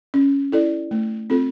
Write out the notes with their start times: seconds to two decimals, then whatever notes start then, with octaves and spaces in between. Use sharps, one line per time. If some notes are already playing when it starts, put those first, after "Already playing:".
0.14 C#4
0.52 E4 A4 D5
0.91 A3
1.30 C4 F4 A4